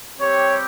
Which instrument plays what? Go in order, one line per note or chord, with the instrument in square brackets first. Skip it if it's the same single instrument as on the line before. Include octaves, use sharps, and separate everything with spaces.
[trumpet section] G3 C4 G4 C#5